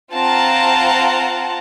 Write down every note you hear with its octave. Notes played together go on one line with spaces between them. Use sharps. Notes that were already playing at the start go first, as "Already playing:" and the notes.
C4 F4 F#5 A5 A#5